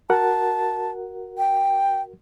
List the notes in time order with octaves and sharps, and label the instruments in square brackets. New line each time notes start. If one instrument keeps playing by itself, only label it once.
[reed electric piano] F#4 A#4 F#5 [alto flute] A5
[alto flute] G5